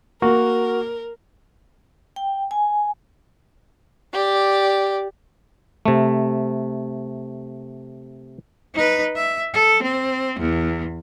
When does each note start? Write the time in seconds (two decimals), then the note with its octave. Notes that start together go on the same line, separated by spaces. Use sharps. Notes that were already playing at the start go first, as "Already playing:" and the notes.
0.22 A#3 F#4 A#4
2.16 G5
2.51 G#5
4.13 G4 D5
5.86 C3 A3
8.74 D#4 B4
9.16 E5
9.54 A4
9.83 C4
10.39 E2